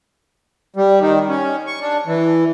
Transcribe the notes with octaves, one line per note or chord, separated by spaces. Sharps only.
G3
D#3
C#4
C#6
D4
E3